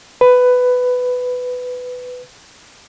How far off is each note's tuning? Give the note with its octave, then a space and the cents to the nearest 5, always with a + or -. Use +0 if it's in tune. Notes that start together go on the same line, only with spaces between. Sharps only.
B4 +15